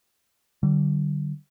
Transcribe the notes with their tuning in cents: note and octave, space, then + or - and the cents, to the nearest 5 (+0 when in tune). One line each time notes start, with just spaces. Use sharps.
D3 +20 G3 -35